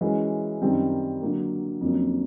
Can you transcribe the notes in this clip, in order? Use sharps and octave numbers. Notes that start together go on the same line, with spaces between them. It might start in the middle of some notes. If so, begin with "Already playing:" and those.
E3 G#3 C#4 F#4 A#4
F#2 D#3 G3 C4
D3 F#3 A#3
F2 D3 F#3 A#3 C#4